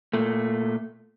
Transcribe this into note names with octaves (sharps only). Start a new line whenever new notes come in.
A#2 A3